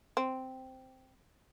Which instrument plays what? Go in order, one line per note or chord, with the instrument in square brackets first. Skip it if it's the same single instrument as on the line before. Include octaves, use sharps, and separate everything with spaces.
[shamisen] C4